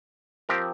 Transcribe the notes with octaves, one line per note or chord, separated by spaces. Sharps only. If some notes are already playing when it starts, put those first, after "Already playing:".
F3 C4 G4 A#4